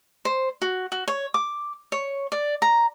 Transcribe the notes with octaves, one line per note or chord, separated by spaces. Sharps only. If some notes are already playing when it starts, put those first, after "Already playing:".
C5
F#4
F#4
C#5
D6
C#5
D5
A#5